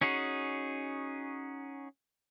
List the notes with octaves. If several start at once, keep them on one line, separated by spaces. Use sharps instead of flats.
C#4 D#4 F#4 G#4